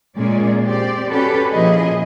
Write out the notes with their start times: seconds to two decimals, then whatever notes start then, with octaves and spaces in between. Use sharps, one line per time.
0.16 A#2 G#3 C#4 G#4 D5
0.66 C4 G4 D5
1.09 C#4 F#4 G4 A4 B4
1.52 A#2 F3 C#4 E4 G#4 D#5